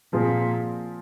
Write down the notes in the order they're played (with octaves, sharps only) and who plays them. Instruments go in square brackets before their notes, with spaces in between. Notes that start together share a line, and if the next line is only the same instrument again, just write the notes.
[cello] A#2 [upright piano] F3 C4 F4 G#4